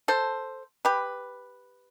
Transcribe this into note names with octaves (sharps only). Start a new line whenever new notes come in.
A4 C5
G4 B4